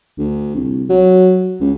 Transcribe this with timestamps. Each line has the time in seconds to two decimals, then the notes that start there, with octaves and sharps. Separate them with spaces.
0.18 D2
0.55 C2
0.89 F#3
1.60 C#2